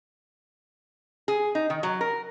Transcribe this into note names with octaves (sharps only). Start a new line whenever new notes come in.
G#4
D#4
D#3
F#3
A#4